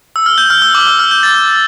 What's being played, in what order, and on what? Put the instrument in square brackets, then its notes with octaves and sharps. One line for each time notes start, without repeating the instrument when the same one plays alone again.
[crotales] E6
F6
G6
F6
E6
D6
E6
F6
G6
A6